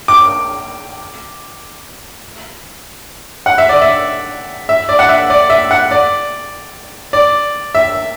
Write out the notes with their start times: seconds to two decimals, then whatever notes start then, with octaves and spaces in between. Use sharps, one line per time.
0.08 D6
3.46 F#5
3.58 E5
3.69 D5
3.82 E5
4.69 E5
4.89 D5
4.99 F#5
5.09 E5
5.30 D5
5.50 E5
5.71 F#5
5.91 D5
7.13 D5
7.75 E5